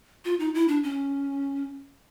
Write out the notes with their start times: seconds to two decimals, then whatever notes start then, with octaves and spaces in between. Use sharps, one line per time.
0.25 F4
0.40 D#4
0.55 E4
0.68 D4
0.83 C#4